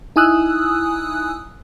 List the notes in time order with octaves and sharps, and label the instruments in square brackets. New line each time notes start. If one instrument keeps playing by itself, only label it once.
[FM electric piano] D#4 E4 G#5 D#6 E6 F#6